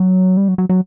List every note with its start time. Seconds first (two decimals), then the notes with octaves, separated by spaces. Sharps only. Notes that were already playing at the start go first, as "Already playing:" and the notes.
Already playing: F#3
0.37 G3
0.48 F#3
0.58 F#3
0.69 F#3